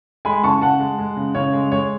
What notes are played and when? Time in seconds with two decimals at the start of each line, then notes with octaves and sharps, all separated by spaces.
0.25 G#3 G#5 B5
0.43 C#3 A5 C#6
0.61 C#3 F#5 A5
0.80 G#3
0.99 G#3
1.17 C#3
1.35 C#3 C#5
1.53 G#3
1.72 G#3 C#5